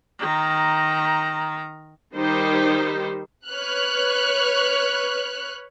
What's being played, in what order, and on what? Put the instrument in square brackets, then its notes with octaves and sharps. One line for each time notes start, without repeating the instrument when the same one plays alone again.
[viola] D#3 A#5
[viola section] D#3 G3 D#4 G4 C5
[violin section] B4 C#5 F6 F#6